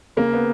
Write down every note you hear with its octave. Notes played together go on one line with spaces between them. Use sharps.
C#3 A#3
B3